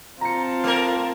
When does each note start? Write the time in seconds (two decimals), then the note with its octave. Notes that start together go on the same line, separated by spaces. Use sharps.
0.21 C4 F4 A5 A#5 C#7
0.64 A3 A#4 F6